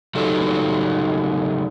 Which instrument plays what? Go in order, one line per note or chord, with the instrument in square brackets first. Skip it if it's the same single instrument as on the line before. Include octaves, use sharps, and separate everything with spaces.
[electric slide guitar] C#3 F#3 G3 D#4 A4